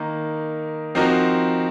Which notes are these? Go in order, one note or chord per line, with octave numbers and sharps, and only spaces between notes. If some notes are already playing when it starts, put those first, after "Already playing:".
Already playing: D#3 A#3 D#4
F3 C4 D#4 F#4 A#4